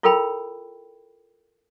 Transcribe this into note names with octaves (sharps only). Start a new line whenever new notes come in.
E4 F4 A4 A#4 G5 B5